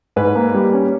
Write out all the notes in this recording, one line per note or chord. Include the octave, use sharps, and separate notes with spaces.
G#2 B4
A#3
G3
C#4